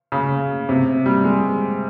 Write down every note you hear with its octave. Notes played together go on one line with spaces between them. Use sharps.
C#3
C3
G3
G#3